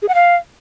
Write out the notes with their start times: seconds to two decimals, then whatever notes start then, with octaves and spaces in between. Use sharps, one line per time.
0.02 G#4
0.08 F#5
0.15 F5